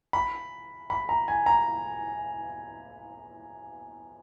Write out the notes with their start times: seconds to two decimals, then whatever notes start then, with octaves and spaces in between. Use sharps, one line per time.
0.13 B5
0.90 B5
1.09 A#5
1.28 G#5
1.46 A#5